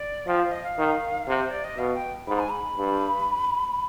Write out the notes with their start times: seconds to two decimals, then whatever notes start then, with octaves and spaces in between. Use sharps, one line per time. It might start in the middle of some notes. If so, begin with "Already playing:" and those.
Already playing: D5
0.27 F3 G5
0.40 F5
0.51 D#5
0.63 F5
0.78 D#3
1.27 C3
1.37 C5
1.51 D5
1.64 D#5
1.78 B2 F5
1.94 G5
2.27 G#2 B5
2.39 G#5
2.49 B5
2.77 G2